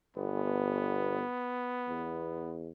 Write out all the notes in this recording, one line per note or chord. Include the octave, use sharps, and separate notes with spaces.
G1 B3
E2